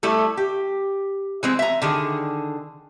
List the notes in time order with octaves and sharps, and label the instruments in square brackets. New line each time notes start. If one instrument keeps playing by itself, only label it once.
[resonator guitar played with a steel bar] G3 A3 E4 A4
G4
E3 G#3 C4
E5 A#5
D3 D#3 G#4